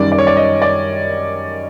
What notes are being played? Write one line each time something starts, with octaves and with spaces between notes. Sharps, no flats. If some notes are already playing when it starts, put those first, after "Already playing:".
Already playing: F#2 D#3 G3 D5
D5
C#5
D5
D#5
D5